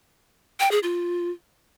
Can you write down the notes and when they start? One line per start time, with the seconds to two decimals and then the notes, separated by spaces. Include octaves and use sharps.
0.60 G5
0.71 G#4
0.83 F4